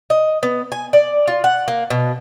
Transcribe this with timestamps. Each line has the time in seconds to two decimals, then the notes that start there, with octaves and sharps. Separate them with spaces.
0.10 D#5
0.43 B3
0.72 G#5
0.93 D5
1.28 F4
1.44 F#5
1.68 A#3
1.90 B2